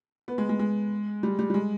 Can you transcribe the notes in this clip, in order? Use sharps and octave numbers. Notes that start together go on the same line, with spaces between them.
B3
G#3
G#3
G#3
G3
G3
G3
G#3